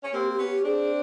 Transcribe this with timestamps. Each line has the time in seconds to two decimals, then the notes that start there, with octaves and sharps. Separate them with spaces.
0.03 C#4
0.13 A#3 C4 G4
0.30 G4
0.39 B3 C#4
0.47 G4
0.64 C4 D4 G#4